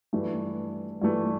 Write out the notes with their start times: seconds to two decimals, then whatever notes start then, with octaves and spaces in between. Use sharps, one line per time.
0.13 G2 E3 A3
1.01 G2 E3 A3